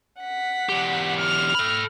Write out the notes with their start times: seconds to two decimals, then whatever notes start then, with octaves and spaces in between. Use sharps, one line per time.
0.21 F#5 B6
0.70 E2 G4
1.20 F6 F7
1.55 A4 B5